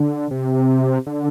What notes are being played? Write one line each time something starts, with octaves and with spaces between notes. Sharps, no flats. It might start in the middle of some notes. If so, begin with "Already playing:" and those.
Already playing: D3
C3
D3